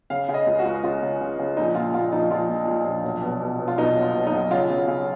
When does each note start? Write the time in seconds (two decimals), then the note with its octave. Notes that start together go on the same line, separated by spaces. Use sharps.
0.10 C#3 F5
0.29 C#3
0.34 D#5
0.46 C#2
0.59 F#4
0.65 C#2
0.83 C#3 F4
1.02 C#3
1.21 C#3
1.39 C#3
1.57 A#1 D#4
1.75 A#2 F4
1.93 A#2 F4
2.12 A#1 D#4
2.31 A#1 F4
2.49 A#2
2.67 A#2
2.86 A#1
3.04 B1
3.22 B2
3.40 B2
3.59 B2
3.68 F4
3.78 B2 D#4
3.95 B1
4.02 F4
4.14 B2
4.27 D#4
4.32 B1
4.51 C#3 F4
4.70 C#3
4.88 C#3